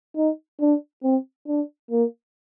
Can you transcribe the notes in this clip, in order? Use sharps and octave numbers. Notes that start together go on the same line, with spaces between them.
D#4
D4
C4
D4
A#3